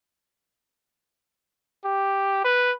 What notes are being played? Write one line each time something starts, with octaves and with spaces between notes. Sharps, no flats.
G4
B4